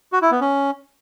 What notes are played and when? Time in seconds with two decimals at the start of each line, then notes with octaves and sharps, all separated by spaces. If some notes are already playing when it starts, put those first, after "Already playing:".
0.13 F#4
0.22 E4
0.31 B3
0.41 C#4